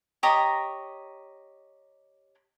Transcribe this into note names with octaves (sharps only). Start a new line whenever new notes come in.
G4 C#5 D#5 A#5